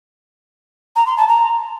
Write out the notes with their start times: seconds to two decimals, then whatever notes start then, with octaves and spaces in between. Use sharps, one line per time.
0.95 A#5
1.06 C6
1.17 A5
1.27 A#5